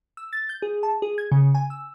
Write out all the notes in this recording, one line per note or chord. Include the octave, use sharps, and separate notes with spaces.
E6
A6
G6
G#4
A5
G#4
G#6
C#3
G#5
E6